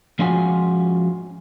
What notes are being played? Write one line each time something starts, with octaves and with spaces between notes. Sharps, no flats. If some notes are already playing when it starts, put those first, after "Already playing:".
F3 G#3 C#4 F4 F#4 G#5